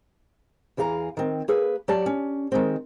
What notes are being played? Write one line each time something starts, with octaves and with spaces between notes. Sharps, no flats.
E2 E3 G#4 F5 A#5
D#3 C4
A#3 G#4 B4
F#3 G4 D5 A5
C#4
D#3 G#3 C4